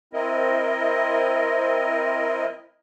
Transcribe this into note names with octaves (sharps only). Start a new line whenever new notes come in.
C4 E4 A#4 D#5